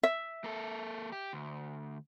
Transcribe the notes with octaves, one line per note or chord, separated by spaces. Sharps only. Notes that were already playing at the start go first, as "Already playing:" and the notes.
E5
A#3 A4
G4
D2